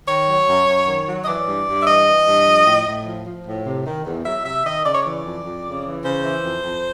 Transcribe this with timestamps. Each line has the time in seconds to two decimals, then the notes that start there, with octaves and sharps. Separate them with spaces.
0.08 D#3 C#5
0.29 F#3
0.48 F#2
0.68 F#2
0.87 D#3
1.08 F#3
1.24 D#5
1.28 E3 D5
1.48 G2
1.68 G2
1.83 E5
1.87 E3 D#5
2.07 E3
2.27 G2
2.47 F3
2.67 A2
2.87 A2
3.06 F3
3.26 F3
3.46 A2
3.66 C3
3.86 D#3
4.06 E2
4.26 F#3 E5
4.45 C3 E5
4.65 D#3 D#5
4.85 C#3 D5
4.94 C#5
5.03 E3 D5
5.24 F2
5.45 F2
5.65 C#3
5.85 E3
6.04 C#3 C5
6.24 E3
6.44 F2
6.64 F2